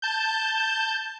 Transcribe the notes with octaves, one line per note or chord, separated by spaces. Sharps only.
A5 G6